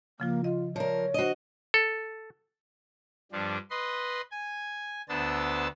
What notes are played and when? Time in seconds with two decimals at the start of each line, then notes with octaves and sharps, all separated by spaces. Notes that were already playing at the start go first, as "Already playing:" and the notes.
0.20 C#3 F3 A#3 F4
0.44 F4 D#5
0.76 F3 A#4 C#5 D5 E5
1.14 D4 F#4 C5 D#5
1.74 A4
3.32 G2 F3 G3 D4
3.70 B4 D#5 C6
4.31 G#5
5.09 D2 B3 D4 C5 A5 E6